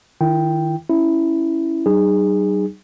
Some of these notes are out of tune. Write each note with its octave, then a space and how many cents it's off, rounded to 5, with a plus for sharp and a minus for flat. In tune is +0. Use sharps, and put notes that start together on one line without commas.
D#3 +0 E4 +35 G5 +0
C#4 +0 E4 +0
G3 -40 D#4 -30 G#4 -20